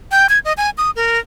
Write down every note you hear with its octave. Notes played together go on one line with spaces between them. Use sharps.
G5
G#6
D#5
G#5
D#6
A#4